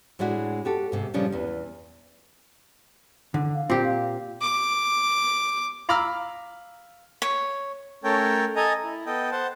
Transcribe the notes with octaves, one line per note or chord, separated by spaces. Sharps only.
A2 G#3 D4 E4 F#4
F#4 G4 A4
G#2 C3
A#2 C#3 F3 G3 C#4 D4
E2 E3
D3
F5
A#2 C4 G4
F5
D6
F5 A#5 B5 D6 E6 F6
C#5
A3 C#4 A4 A#4 C#5 G5
A4 D#5 G#5 A#5
E4
B3 A4 D#5 G5
C5 F#5 A5